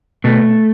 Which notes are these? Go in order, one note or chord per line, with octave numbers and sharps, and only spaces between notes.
B2 A3